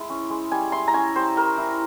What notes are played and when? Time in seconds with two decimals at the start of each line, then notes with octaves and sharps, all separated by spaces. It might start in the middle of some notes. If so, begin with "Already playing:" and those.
Already playing: G#3 E4
0.10 C#4
0.30 G#3
0.52 G3 G#5
0.72 E4 C6
0.88 A#5
0.94 C#4 G#5
1.16 G3 C5
1.36 G3 A#4
1.58 E4